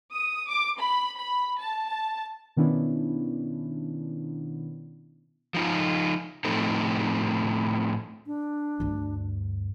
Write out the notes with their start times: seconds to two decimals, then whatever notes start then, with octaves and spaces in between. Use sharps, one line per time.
0.14 D#6
0.49 D6
0.80 B5
1.19 B5
1.60 A5
1.89 A5
2.56 B2 D#3 B3 C#4 D4 E4
5.54 F3 D#4 F4
6.44 A2 F3 A3 C4 D#4
8.26 D4
8.80 D2 G2